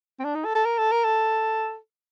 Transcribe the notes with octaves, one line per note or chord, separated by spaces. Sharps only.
C4
D4
D#4
A4
A4
A#4
A4
A#4
A4